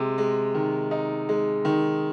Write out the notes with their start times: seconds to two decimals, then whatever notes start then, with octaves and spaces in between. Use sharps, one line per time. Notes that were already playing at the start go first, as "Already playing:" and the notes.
Already playing: C3 G#3
0.18 G#3
0.55 D#3
0.91 D#4
1.29 G#3
1.65 D#3